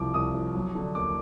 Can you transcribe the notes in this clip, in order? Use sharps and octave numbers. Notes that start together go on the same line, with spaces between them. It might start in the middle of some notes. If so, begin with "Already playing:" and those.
Already playing: C2 F3 D6
C2 D#6
F3
F#3
D3
D#2 D6